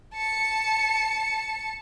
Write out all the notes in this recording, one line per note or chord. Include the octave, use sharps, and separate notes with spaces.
A5 C#7